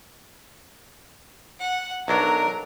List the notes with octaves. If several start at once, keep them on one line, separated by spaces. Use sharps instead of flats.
F#5
B1 F#3 D4 A#4 A#5